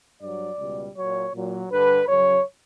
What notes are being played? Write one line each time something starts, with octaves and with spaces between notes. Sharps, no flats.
G2 F#3 D5
C#2 B2 G3
A#2 F#3 C#5
A#2 F#3
G2 D3 G3 B4
F#2 C#3 F#3 C#5